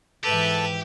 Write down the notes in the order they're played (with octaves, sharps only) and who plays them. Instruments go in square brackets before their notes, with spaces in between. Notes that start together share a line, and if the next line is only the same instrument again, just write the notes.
[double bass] G#2 E3 [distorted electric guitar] G4 [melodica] A4 A5 [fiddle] B4 E5